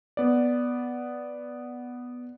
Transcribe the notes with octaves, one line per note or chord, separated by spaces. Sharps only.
B3 D5